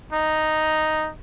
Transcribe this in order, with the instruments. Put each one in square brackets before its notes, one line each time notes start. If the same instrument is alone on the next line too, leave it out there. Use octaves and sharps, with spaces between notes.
[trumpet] D#4